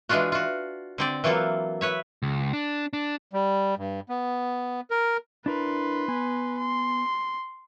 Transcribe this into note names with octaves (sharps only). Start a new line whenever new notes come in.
E3 G#3 D4 F4 F#4
F4 F#4
D3 C4 D5
E3 F#3 A#3 F4 A4
B4 C#5 E5
C#2
D4
D4
G3
G2
B3
A#4
D4 E4 A#4 B4 C6
B3 G#5
C6